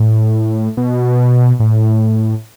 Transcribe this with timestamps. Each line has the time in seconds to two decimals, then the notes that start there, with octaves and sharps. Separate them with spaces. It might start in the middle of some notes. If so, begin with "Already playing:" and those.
Already playing: A2
0.77 B2
1.60 A2